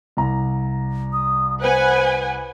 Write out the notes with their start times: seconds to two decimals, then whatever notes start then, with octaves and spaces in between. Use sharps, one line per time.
0.17 C2 A#5
1.13 D#6
1.61 B4 C5 F#5 G#5